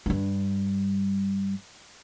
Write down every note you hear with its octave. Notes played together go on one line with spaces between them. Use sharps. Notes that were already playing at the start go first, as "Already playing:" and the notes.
G2 G3